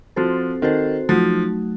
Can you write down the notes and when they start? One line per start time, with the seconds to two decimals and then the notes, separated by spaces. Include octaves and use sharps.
0.16 F3 C4 F#4 A4 C5
0.62 D#3 C4 F#4 A4 C5
1.09 F3 F#3 A3 D#4 F#4